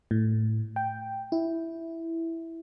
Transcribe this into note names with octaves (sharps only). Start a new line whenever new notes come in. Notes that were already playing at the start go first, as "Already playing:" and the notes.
A2
G5
E4